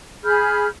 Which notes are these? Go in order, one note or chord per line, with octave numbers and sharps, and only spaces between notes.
G#4 B5 F6 G6